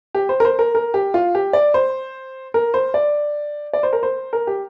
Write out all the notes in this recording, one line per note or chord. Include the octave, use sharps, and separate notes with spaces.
G4
C5
A#4
C5
A#4
A#4
G4
F4
G4
D5
C5
A#4
C5
D5
D5
C5
A#4
C5
A#4
G4